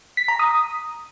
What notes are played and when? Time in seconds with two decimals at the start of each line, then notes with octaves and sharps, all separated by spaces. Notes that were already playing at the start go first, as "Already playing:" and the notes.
0.17 B6
0.28 A#5
0.39 D#6